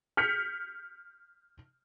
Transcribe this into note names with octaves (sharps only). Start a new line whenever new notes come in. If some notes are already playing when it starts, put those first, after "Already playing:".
F6 G6 B6 C#7 F7